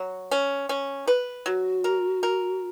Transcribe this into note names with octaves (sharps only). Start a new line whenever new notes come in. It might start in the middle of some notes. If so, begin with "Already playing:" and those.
Already playing: F#3
C#4
C#4
B4
F#3 F#4
A#4
A#4